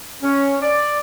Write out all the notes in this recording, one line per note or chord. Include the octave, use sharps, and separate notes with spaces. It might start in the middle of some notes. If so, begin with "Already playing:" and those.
C#4
D5